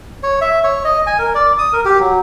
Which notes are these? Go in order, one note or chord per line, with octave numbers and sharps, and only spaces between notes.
C#5
E5
C#5
D#5
G#5
A#4
D5
D#6
A#4
G4
F#3